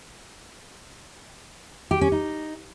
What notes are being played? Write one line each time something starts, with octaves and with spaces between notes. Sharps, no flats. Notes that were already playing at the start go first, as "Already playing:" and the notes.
G4
C#4
D#4